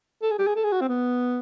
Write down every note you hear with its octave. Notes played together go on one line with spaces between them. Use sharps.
A4
G#4
G4
G#4
A4
G#4
F#4
C4
B3